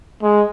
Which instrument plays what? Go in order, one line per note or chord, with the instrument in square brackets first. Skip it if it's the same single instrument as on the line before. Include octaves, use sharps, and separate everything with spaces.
[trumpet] G#3